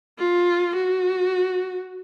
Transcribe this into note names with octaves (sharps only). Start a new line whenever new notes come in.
F4
F#4